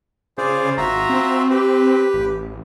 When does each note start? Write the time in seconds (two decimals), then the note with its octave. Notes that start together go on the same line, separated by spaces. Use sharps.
0.38 C#3 F4 G#4 C5 D5
0.78 G#1 F4 F#4 E5 A#5
1.09 C4
1.50 G4 B4
2.14 A1